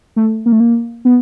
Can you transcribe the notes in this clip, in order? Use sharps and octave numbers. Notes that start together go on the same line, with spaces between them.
A3
A#3
A3
A#3
B3